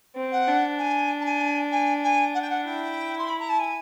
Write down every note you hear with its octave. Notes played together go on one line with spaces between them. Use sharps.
C4
F#5
D4
G#5
A5
G#5
G#5
G#5
F#5
G5
F#5
E4 G5
C6
B5
A#5
A5
G#5